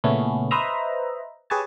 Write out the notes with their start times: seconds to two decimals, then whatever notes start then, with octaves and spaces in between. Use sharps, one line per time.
0.04 A#2 C#3 A3 B3 C#4 E4
0.51 B4 C5 D#5 E5 A#5
1.50 G4 G#4 B4 C#5 G#5 A5